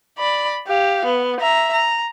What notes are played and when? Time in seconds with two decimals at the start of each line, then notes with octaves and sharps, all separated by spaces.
0.18 D5 B5
0.67 G4 F5
1.06 B3
1.40 E5 A#5
1.73 A#5